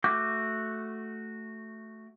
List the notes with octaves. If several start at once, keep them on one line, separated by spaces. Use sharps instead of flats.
A3 F#4 D6 G6